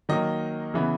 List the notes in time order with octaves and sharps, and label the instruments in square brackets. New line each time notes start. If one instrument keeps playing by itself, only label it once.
[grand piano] D#3 F#3 A#3 D#5
C#3 E3 B3